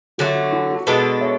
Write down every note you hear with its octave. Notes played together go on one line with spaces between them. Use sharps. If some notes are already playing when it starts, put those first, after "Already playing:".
D3 F#3 A3 F#4
F#4
E4
F#4
B2 G#3 D4 A4 B4
C#5 E5